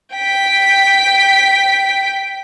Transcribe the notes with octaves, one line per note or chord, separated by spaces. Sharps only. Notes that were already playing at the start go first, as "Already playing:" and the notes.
G5 B6